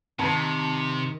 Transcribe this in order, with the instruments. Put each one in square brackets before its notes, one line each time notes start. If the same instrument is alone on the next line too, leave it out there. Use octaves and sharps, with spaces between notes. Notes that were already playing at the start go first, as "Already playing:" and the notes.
[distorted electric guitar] C3 [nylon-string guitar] D#3 [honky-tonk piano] A5 A#5 G#6